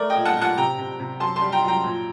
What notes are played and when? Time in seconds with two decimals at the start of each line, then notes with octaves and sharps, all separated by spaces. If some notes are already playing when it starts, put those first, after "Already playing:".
Already playing: A3 A#4 D5
0.10 D#5 G5
0.15 A#2
0.25 F#5 A5
0.36 A#2
0.41 F#5 A5
0.57 C3 G5 A#5
0.78 C3
1.00 C3
1.20 F#2 A5 C6
1.36 A5 C6
1.42 G3
1.52 G5 A#5
1.63 F#2 G5 A#5
1.84 A#2